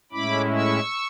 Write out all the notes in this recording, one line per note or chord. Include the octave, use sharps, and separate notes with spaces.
A2 G#3 C#4 E4 B5 D6
C#6 E6